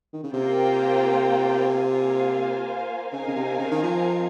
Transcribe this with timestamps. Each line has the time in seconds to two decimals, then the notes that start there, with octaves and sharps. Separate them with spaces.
0.13 D#3
0.23 C#3
0.33 C3 A#3 F4 C5 G5
1.73 A#3 F4 C5 F5 G#5
3.12 C#3 C4 D#4 A#4 F5 G#5
3.28 C#3
3.35 C3
3.59 C#3
3.71 D#3
3.83 F3